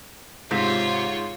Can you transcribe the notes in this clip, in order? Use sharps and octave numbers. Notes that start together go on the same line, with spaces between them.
G#2 C3 F4 C#5